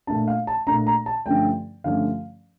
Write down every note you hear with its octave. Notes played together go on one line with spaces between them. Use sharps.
A#2 A3 D4 A5
F5
A5
A#2 A3 D4 A#5
A#5
A5
G2 D3 F3 A3 C#4 G5
G2 D3 F3 A3 C#4 F5